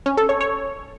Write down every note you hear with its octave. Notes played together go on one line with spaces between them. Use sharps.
C#4
A4
C#5
C#5